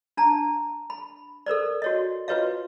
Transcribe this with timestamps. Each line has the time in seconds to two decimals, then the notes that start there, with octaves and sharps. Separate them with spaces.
0.17 D4 A5 A#5
0.90 B5
1.46 A4 A#4 C5 D5
1.82 F#4 C#5 D#5
2.28 F4 F#4 B4 C#5 D#5 F5